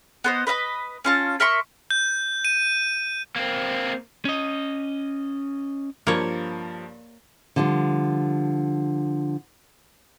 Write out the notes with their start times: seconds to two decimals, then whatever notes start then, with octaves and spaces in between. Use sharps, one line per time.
0.24 B3 C5 D#5
0.47 B4 D#5 E5 B5
1.05 C#4 F4 A5
1.40 A#4 E5 C6 C#6
1.90 G6
2.45 D#7
3.36 A#3 C4
4.25 C#4 D#5
6.07 G2 F3 A#3 C#5
7.56 D3 F3 G3